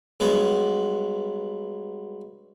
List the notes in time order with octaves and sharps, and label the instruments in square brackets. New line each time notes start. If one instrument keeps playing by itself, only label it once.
[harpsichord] G2 F#3 G#3 B3